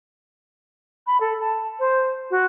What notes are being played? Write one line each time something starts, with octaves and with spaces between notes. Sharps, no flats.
B5
A4
A5
C5
F#4